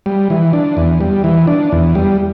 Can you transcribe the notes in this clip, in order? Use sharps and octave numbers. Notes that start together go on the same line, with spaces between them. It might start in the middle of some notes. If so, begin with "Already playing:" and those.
G3
E3
D4
E2
G3
E3
D4
E2
G3